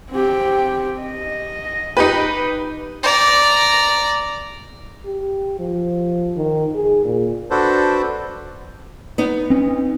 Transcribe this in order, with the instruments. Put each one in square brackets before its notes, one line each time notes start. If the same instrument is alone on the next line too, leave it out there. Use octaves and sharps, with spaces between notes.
[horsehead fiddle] C4 G4
D#5
[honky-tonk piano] D#4 G4 B4
[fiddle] D5 A#5
[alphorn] G4
F3
D#3
G#4
A#2
[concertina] D4 F#4 A4 B4 C5
[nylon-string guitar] B3 D#4
[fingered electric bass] C4 C#4